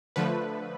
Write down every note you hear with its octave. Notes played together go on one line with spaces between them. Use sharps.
D3 F3 A3 B4